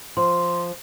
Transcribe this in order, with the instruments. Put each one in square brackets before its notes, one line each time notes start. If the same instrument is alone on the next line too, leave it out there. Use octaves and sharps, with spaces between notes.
[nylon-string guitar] F3 [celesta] C6